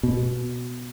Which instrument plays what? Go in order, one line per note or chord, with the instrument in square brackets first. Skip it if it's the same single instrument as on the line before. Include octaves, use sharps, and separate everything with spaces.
[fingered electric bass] B2